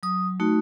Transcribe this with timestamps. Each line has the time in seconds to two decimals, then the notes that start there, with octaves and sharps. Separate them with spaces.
0.03 F#3 D#6
0.40 A3 D#4 F#4